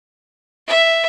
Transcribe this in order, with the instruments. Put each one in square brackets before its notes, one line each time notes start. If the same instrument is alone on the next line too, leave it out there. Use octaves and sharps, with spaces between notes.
[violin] E5